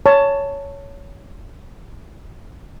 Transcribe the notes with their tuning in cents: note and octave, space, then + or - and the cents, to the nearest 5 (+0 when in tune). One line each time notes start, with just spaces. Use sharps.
C#5 +10 A5 +15